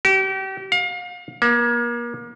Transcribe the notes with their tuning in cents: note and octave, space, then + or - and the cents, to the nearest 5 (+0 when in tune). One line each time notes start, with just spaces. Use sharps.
G4 -35
F5 +35
A#3 +35